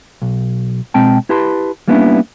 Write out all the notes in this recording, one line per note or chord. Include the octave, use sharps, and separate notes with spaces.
B1
B2 G#3 C4 G5 A5
E4 G4 B4 A5 B5 C6
G3 A#3 B3 C#4 D4 E4